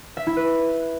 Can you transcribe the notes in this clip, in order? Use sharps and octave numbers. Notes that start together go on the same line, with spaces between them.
E5
E4
B4